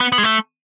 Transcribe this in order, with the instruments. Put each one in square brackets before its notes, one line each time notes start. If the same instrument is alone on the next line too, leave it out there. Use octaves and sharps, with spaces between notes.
[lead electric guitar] B3
B3
G#3
A3